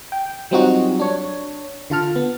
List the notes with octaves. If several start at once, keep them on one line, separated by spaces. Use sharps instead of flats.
G5
F#3 G3 C4 D#4 F4 F#4
D4 C#5
D3 F4 A5 F6
B3